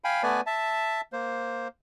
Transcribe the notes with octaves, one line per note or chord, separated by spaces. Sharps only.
F5 G5 G#5 B5
A3 B3 B4 D5 G#5
E5 A5
A#3 C5